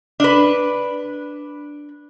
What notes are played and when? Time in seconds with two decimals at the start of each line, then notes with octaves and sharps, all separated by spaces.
0.20 D4 B4